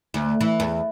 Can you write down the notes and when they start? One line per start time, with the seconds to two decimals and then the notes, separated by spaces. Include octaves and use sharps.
0.14 D2
0.41 E3
0.60 E2